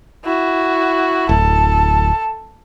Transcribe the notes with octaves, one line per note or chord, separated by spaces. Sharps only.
E4 F#4
D1 A4